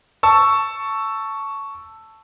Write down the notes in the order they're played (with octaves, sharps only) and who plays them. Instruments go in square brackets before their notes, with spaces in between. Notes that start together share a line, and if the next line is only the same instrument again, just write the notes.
[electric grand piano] A5 C#6 E6